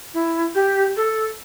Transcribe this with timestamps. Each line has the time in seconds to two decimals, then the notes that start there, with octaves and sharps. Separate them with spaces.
0.14 E4
0.55 G4
0.97 A4